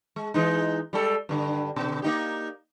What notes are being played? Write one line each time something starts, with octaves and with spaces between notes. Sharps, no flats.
G#3
E3 G#3 D#4
G3 G#3 A4
G2 D3
B2 D3
A#3 D#4 G4